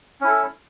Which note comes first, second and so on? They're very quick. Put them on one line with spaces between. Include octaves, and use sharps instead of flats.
C#4 E4 A4